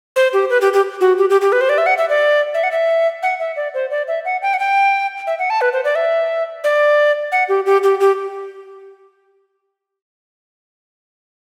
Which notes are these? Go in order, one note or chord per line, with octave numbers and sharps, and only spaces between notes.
C5
G4
B4
G4
G4
F#4
G4
G4
G4
B4
C5
D5
E5
F#5
E5
D5
E5
F#5
E5
F#5
E5
D5
C5
D5
E5
F#5
G5
F#5
G5
E5
F#5
A5
B4
C5
D5
E5
D5
F#5
G4
G4
G4
G4